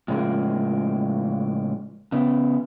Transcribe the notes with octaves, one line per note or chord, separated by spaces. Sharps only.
A2 C#3 F3 G#3 A#3
C#3 B3